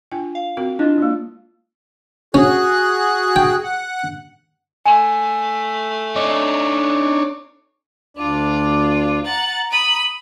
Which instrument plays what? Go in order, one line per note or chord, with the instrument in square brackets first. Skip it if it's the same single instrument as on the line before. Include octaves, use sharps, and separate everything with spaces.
[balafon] D4 F4 G5
[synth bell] F5
[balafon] C4 F#4 A#4
[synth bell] D4 F4 [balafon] E4 D#5
[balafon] G#3 A#3
[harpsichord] C#4 [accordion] F#4 G#4 F#6
[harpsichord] G5
[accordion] F#5
[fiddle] A3 [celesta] G#5
[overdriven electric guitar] D4 D#4 [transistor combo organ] C#5 D5
[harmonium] D2 D4 D5 [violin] F4
[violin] F#5 A6 [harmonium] A#5
[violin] B5 D#6